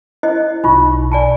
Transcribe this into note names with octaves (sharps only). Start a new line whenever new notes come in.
E4 C5 D#5
B1 D#4 F4 C#6
D5 G#5 A5